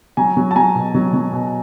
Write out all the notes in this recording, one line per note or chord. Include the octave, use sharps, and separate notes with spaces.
F#3 G#5 A#5
F#3
A5
F#3 G#5 A#5
B2
F#3
F#3
B2